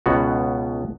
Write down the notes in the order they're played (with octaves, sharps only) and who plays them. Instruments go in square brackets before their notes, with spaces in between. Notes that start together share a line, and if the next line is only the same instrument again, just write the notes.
[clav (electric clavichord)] C#2 B2 B3 F#4